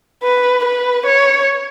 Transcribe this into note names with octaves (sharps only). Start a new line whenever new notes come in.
B4
B4
C#5